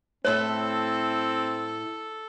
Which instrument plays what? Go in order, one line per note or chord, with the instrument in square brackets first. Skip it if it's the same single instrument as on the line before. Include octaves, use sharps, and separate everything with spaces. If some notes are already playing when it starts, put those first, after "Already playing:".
[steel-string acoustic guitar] A2 E4 E5 [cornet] C4 [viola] A4 [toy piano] C#5